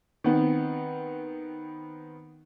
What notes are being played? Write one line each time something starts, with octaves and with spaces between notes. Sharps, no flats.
D#3 B3 C4